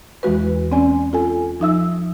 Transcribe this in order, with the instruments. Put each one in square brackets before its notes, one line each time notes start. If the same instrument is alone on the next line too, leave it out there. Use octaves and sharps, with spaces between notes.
[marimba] E2 E3 G#3 F#4 B4
C4 C#4 D5 G#5
F4 A4 G#5
F3 D#4 E5 E6